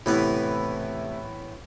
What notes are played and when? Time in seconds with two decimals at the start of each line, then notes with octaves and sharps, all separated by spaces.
0.06 A2 C3 E3 A3 B3 E4